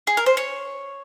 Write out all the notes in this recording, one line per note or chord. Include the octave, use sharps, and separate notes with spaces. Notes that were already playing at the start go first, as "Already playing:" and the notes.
G#4
A#4
C5
C#5